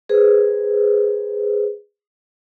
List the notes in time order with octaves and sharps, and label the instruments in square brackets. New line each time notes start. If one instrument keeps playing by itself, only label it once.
[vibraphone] G#4 B4 C5